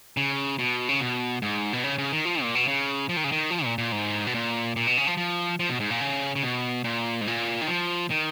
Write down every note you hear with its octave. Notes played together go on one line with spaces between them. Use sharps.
C#3
B2
C#3
B2
G#2
B2
C#3
C#3
D#3
F3
A#2
B2
C#3
F3
D#3
C#3
D#3
F3
A#2
A#2
G#2
B2
A#2
A#2
B2
C#3
F3
F3
F3
B2
G#2
A#2
C#3
C#3
B2
A#2
G#2
A#2
D#3
F3
D#3